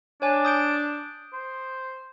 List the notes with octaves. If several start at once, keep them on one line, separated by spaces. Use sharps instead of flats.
D4 C#5 G#5
D#6 G6 D7
C5